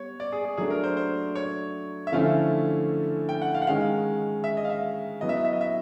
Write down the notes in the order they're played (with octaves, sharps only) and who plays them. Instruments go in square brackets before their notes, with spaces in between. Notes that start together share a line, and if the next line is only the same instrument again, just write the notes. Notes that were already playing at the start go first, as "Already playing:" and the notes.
Already playing: [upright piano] G3 B3 [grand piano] C#5
[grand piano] D5
G#4
G#4
[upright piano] F#3 A3 D4 [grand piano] G#4
[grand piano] A#4
C5
C5
C#5
E5
[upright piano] D3 F3 A3 C#4 E4 [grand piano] F5
[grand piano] G5
F#5
F5
F#5
[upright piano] D#3 G#3 C#4 [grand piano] F5
[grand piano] E5
D#5
F5
E5
[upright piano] F#3 B3 E4 [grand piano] D#5
[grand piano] E5
D#5
E5
D#5
E5